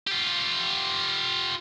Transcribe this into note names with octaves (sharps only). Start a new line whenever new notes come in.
F4 G4